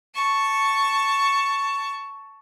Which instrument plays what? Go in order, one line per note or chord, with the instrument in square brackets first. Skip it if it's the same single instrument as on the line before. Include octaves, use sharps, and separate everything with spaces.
[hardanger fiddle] A5 C#6